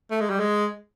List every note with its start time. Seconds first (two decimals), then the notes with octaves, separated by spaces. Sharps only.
0.11 A3
0.21 G#3
0.30 G3
0.40 G#3